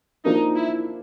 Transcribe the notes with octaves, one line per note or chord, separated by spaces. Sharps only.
F3 A#3 D4 D#4
E4